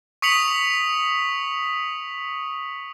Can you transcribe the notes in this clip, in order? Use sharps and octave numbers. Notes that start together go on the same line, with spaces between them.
C#6 D#6 B6 C#7 F7 F#7